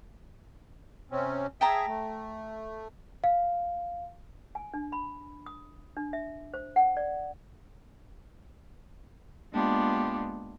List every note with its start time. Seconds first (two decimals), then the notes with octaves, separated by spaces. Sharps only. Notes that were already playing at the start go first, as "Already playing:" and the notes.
1.12 C3 C4 C#4
1.61 G#4 E5 G5 A5 A#5
1.87 A3
3.24 F5
4.55 G#5
4.74 D4
4.92 B5
5.46 D#6
5.97 D4
6.13 E5
6.54 C5
6.76 F#5
6.97 D5
9.53 G#3 A#3 B3 D4 F4 G4